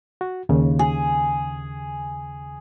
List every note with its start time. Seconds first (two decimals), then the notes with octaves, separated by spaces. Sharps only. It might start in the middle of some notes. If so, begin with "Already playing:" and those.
0.21 F#4
0.49 D#2 C#3
0.79 G#4